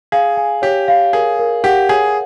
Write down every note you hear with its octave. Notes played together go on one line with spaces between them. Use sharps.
G#4 F5
G#5
G4 C#5
F5
G#4 A#4
A#4
G4 F#5
G#4 C#5